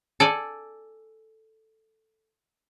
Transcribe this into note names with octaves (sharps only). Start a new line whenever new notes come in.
A4 D5 G#5